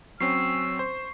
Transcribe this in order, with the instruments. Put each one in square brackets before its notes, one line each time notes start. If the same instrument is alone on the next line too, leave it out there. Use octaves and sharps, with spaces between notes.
[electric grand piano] F#3 C4 C#4 [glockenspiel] C#6 C7 [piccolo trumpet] E6
[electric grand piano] C5